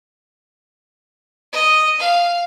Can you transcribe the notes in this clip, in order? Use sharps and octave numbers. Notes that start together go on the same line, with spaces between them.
D#5
F5